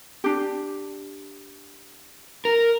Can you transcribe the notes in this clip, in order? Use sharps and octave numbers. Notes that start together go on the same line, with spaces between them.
D4 G4
A#4